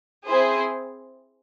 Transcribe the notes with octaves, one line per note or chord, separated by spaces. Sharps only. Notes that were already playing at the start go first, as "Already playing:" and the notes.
C4 E4 G#4 C5